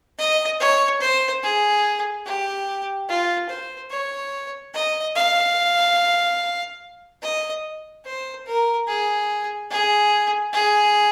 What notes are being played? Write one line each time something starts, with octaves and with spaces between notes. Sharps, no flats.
D#5
C#5
C5
G#4
G4
F4
C5
C#5
D#5
F5
D#5
C5
A#4
G#4
G#4
G#4